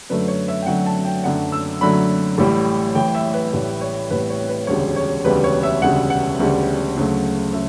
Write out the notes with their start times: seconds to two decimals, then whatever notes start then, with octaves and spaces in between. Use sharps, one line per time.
0.10 F#2 D3 F#3 A3 B4
0.28 C#5
0.48 E5
0.62 G5
0.66 F#2 D3 F#3 A3 F#5
0.86 A5
1.05 G5
1.23 F#2 D3 F#3 A3 F#5
1.52 E6
1.81 F#2 D3 F#3 A3 B5
2.38 A1 A2 G3
2.95 A1 A2 G3 G5
3.15 E5
3.34 B4
3.53 A1 A2 G3
3.81 C#5
4.10 A1 A2 G3 B4
4.30 C#5
4.49 B4
4.67 E1 D2 C#3 G3 C#5
4.96 C#5
5.24 E1 D2 C#3 G3 B4
5.44 C#5
5.63 E5
5.82 E1 D2 C#3 G3 F#5
6.10 F#5
6.40 E1 D2 C#3 G3
6.97 D2 C#3 F#3 A3
7.53 C#3 E5